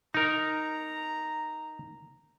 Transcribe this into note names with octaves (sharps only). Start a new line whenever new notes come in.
D#4 A#4 A#5